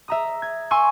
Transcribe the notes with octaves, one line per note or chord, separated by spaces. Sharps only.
E5 A#5 D#6
G#6
G#5 C6 C#6 E6